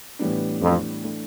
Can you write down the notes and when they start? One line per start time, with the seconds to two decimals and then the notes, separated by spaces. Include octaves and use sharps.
0.19 A2 E3 G3 B3 D4
0.61 F2
1.04 E3 A3 D4